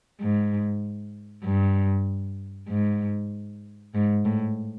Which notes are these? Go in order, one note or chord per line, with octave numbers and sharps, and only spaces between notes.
G#2
G2
G#2
G#2
A2